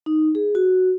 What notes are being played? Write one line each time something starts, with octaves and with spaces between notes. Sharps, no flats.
D#4
G#4
F#4